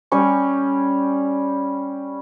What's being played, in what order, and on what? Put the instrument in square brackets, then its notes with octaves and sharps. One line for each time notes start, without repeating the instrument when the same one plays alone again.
[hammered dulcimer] G3 C#4 G#5 C#6